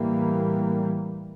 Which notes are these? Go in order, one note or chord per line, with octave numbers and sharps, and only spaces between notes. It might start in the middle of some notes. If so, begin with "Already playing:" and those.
Already playing: A2 E3 G3 A#3